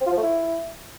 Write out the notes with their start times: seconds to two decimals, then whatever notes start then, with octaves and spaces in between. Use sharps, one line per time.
0.01 C4
0.06 F4
0.12 F3
0.18 A3
0.23 E4